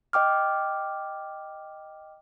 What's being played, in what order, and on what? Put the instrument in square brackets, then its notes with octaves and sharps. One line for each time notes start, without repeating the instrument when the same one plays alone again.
[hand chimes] D#5 G5 D6 F6